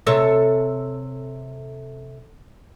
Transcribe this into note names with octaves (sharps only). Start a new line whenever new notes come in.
C3 A4 C#5